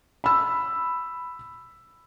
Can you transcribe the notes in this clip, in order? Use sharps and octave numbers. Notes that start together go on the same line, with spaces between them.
B5 E6